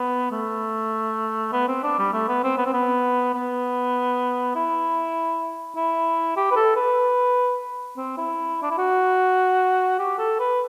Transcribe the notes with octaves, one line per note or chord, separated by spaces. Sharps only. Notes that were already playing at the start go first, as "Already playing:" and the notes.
Already playing: B3
A3
B3
C4
D4
G3
A3
B3
C4
B3
C4
B3
B3
E4
E4
G4
B4
A4
B4
C4
E4
D4
E4
F#4
G4
A4
B4